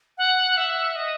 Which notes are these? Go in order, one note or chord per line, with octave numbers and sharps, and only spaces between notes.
F#5
E5
D#5